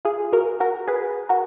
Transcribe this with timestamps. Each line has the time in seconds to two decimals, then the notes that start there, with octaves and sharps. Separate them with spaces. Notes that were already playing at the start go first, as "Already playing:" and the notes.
0.05 F4 G#4
0.33 F#4 A#4
0.60 F#4 A#4
0.88 G#4 B4
1.29 F#4 A#4